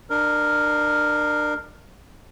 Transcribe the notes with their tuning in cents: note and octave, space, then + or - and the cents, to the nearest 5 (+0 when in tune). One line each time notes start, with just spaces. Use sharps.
D4 +30 A#4 +0